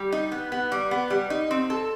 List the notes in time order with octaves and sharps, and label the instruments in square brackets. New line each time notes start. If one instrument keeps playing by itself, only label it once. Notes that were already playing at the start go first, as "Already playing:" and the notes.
Already playing: [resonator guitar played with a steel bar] G3
D#4
B3
B3
G3
B3
G3
D#4
C4
A4